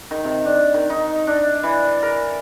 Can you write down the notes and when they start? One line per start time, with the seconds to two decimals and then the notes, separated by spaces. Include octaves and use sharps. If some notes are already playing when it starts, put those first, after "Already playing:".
0.11 D#3
0.25 C3
0.45 D4
0.74 D#3
0.90 D#4
1.27 D4
1.63 E3
2.02 A#4